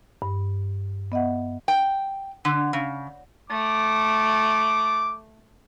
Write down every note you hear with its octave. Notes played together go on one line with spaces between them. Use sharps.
G2
B3 D#5 E5 F#5
G5
D3
C#3
A3 D6